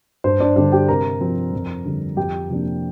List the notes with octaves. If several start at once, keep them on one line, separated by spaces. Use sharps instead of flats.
G2 C5
D4 D5
D3 G3 D4 D5
G4 G5
C3 A#4 A#5
F3 C4
F2
D3 G3
F2 G4 G5
C3 F3 A#3 D4